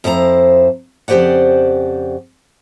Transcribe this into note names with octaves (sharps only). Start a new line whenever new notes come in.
F2 F3 E4 C5 A#5
F2 C#3 G4 C5 D5 F#5